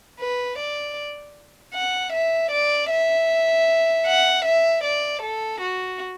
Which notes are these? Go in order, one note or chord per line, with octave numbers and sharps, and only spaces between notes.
B4
D5
F#5
E5
D5
E5
F#5
E5
D5
A4
F#4